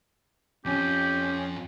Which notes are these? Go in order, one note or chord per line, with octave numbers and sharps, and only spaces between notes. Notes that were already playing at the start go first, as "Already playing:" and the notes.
F2 C#4 G4